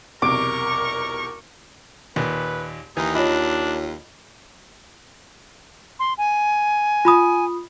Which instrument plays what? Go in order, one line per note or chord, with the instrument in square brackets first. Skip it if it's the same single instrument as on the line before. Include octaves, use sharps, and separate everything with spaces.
[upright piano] B1 E2 C3 [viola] A#4 C#6 [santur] D6
[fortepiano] D#2 A#2 [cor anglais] B4
[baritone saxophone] D#2 [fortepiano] E3 [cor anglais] D#4
[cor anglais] D4 [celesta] F4 C#5 [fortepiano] D#5 B5
[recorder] C6
G#5
[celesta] F4 B5 D#6